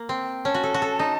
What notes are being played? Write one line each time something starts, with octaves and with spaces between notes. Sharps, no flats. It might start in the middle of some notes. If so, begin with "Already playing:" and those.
Already playing: A#3
C4
C#4 A5
F#4
A4
F#4
A4
D#4